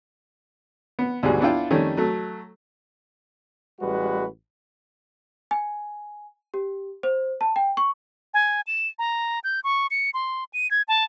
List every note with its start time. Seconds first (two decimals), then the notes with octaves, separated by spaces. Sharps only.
0.99 B3
1.23 D2 G#2 B2 G3 G#4
1.41 B3 D4 E4 F4 G5
1.71 F2 D#3 G3 A3 C#4
1.97 F#3 A3
3.80 A1 G3 G#3 F#4 B4
5.51 G#5
6.54 G4
7.03 C5
7.41 A5
7.56 G5
7.77 C#6
8.34 G#5
8.67 E7
8.99 A#5
9.44 G6
9.64 C#6
9.91 C#7
10.14 C6
10.53 D#7
10.71 G#6
10.88 A5